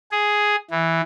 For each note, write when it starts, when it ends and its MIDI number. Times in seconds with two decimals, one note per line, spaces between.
0.11 0.56 68
0.70 1.01 52